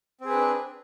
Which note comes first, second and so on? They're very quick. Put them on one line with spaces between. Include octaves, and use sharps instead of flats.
C4 G#4 B4 D4